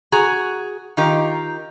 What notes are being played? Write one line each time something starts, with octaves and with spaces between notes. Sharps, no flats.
F#4 G#4 A#5
D#3 D#4 F4 G4 A#4